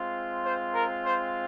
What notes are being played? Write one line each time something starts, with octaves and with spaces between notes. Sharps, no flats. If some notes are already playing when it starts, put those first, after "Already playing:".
Already playing: G#3 C4 F4
C5
A#4
C5